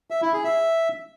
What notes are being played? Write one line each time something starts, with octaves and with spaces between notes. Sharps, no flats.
E5
E4
G#4
E5